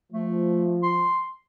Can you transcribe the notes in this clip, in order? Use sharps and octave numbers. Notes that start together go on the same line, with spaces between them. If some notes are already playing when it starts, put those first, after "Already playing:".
F3 A3
C6